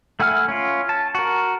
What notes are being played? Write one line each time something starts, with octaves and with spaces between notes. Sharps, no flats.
A3 E4 F#5 G#5 F6
C#4 F4
A5
F#4 A#4